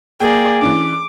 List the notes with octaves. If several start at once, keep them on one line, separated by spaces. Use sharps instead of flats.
A#3 G#4 D5 G5
E3 C#4 D4 D6